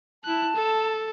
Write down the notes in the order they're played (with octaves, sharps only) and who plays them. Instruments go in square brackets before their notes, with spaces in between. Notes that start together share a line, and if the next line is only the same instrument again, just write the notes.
[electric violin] E4 F#6 [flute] A5
[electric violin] A4